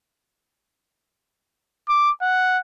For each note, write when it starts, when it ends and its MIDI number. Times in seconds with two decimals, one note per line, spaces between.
1.89 2.11 86
2.22 2.58 78